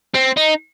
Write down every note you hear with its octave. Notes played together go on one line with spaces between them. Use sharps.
C4
D#4